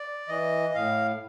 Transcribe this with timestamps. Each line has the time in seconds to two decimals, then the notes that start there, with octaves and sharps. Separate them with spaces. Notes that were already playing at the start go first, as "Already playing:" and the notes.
Already playing: D5
0.28 E3 D#5
0.74 A2 F5